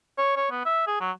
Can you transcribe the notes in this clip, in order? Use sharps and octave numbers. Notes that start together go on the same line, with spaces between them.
C#5
C#5
B3
E5
G#4
F#3